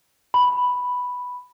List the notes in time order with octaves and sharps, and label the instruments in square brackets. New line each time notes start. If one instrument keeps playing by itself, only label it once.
[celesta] B5